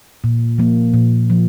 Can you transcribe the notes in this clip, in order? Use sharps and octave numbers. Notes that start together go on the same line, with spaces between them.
A#2
F3 A#3
A#2
F3 A#3